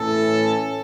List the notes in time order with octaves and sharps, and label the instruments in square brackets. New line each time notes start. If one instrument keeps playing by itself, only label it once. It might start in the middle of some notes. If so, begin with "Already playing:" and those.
Already playing: [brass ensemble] A2 E3 C#4 A4